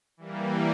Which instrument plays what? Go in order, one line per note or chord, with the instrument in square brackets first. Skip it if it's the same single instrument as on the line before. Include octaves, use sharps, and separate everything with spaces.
[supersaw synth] E3 G3 A#3